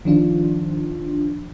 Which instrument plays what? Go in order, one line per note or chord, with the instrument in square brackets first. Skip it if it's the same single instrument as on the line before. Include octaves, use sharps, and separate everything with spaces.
[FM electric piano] D#3 F3 D4 F4